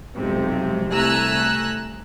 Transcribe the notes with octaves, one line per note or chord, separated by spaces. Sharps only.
B1 F2 G#2 C3
C2 A3 G#5 A#5 E6 F#6